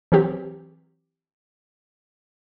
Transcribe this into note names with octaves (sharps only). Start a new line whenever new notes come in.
E3 F#3 C4 G4